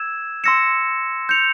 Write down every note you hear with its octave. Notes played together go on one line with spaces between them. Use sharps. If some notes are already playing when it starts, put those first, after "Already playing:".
Already playing: E6 G#6 E7
C6 E6 A#6 C#7 E7
G6 C#7 F7